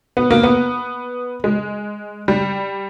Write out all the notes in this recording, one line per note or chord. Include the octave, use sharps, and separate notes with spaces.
B3
A#3
B3
G#3
G3